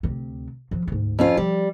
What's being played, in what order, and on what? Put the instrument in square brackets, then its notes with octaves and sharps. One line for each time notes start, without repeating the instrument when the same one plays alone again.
[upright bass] D2 C3
F3 F#3
D2 G#2
[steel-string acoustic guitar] F2 C#4 F4
[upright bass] F3 [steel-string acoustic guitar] G3